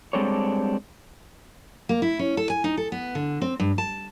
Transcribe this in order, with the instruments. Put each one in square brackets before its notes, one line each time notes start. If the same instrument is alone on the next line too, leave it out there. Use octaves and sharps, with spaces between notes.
[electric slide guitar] G3 G#3 C4 D4 A4 C#5
[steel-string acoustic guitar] A#3
E4
C#4
A4
G#5
D#4
A4
B3
D3
C4
G2
A5